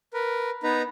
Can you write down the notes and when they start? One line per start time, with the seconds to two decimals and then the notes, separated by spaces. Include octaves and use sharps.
0.14 A#4 B4
0.63 B3 D#4 B4 A#5